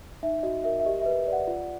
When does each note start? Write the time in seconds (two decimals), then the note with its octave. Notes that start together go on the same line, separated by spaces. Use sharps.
0.23 D#4 E5
0.43 F#4 D#5
0.64 A#4 E5
0.80 E5
0.86 G4 D#5
1.01 B4 E5
1.27 D5
1.33 F#5
1.48 F4